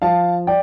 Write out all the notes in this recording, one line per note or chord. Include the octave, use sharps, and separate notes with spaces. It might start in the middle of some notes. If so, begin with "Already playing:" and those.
F3 F5 A5
D5 G5